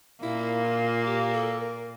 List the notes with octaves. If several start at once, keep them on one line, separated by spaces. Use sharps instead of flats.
A#2 A#3 E4
F4
G4
A4
A#4